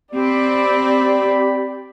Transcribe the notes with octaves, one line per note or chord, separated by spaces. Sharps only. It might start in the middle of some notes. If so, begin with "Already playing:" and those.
C4 G4 D5 B5